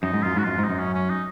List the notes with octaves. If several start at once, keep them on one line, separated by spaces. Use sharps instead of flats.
F#2 D#4
G#2
F#2 F4
G#2 F#4
F#2 F4
G#2
D#4
F#2
C#4
C#4
D#4